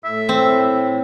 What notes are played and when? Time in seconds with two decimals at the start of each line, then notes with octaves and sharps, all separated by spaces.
0.04 A2 E5
0.29 C4